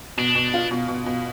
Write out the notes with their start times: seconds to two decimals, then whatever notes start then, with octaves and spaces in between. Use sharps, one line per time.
0.18 B2 D4
0.35 B2
0.54 F4
0.71 B2
0.88 B2
1.06 B2